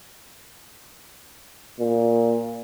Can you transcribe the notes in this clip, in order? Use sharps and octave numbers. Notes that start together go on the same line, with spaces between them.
A#2